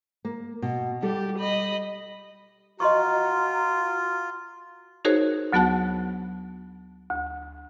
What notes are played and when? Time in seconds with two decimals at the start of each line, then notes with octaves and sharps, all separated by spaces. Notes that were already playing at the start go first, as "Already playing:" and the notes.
0.25 A#3
0.62 B2
1.03 G3 G4 A4
1.39 D#5 B5
2.80 F4 F#4 D#5 A#5 C6 C#6
5.05 D#4 F#4 G#4 A#4 C5 C#5
5.53 D2 F#3 B3 F#4 A5 F#6
7.10 D2